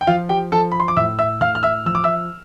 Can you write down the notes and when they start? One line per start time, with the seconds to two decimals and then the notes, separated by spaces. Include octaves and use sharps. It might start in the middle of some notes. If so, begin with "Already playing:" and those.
0.01 G5
0.07 F3 F4 F5
0.29 G4 G5
0.52 F3 A4 A5
0.72 B5
0.80 C6
0.88 D6
0.97 A2 E5 E6
1.19 E5 E6
1.41 A2 F5 F6
1.55 F6
1.63 E5 E6
1.85 F3 E6
1.95 D6
2.04 E5 E6